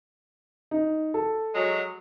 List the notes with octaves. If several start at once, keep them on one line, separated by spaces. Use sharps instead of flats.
D#4
A4
F#3 G#3